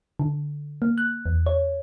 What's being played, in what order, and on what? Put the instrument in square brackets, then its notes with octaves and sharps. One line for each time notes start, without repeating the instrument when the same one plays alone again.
[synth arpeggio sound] D3
A#3
F#6
E2
C#5